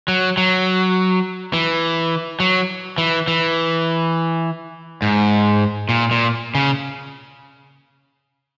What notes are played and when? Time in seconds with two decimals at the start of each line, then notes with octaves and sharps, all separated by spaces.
0.08 F#3
0.37 F#3
1.53 E3
2.40 F#3
2.98 E3
3.28 E3
5.02 G#2
5.89 A#2
6.11 A#2
6.55 C#3